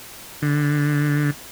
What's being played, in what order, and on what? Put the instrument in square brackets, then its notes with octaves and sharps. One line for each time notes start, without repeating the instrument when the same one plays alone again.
[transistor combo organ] D3